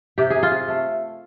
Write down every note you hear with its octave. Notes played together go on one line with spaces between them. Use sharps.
C3 G4
G#4
C3
F4
C3
A3